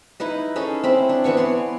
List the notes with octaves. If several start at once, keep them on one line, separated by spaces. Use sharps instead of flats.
D#4 E4 B4 D#5
C#4 D#4 G#4 A4
C4 E4 B5
D4
E3 B3 B4 C#6
C#5 D5 G#5 C6